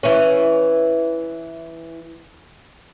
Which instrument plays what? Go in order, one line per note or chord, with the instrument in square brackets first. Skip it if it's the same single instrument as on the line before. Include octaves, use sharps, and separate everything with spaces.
[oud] E3 C#4